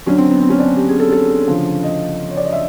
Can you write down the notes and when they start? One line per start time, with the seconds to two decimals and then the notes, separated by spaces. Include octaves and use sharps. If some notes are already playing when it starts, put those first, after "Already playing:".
0.06 D2 D3 F#3 C#4
0.18 C4
0.31 B3
0.41 C4
0.50 C#4
0.59 D4
0.76 G4
0.89 G#4
1.00 A4
1.12 A4
1.48 D2 C#3 F3
1.83 D#5
2.30 C#5
2.37 D5
2.45 D#5
2.53 E5